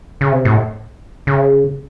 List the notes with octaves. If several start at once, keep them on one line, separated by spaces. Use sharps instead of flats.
C#3
C3
A2
C#3